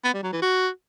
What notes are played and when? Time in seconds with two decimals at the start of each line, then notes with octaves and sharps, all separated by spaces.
0.04 B3
0.14 G3
0.23 F#3
0.33 E3
0.42 F#4